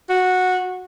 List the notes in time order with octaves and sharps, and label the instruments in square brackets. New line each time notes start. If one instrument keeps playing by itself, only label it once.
[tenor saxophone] F#4